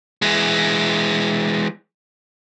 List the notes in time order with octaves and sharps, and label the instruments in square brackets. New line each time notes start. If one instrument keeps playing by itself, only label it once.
[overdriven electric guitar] E3 G#3